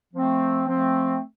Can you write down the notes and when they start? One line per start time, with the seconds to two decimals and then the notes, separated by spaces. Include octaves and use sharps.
0.13 F3 A3 C4
0.66 F3 A3 C4